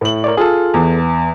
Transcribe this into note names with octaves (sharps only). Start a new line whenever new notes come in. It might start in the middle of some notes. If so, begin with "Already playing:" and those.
A2 F#7
A#4 C#5 D5
F4 G#4 A4
E2